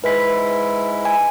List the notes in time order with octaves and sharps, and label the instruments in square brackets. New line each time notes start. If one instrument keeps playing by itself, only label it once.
[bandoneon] G#2 G#3 E4 [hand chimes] B4 B6
[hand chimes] G#5